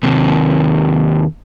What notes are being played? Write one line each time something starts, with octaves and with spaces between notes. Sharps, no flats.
D#2 C3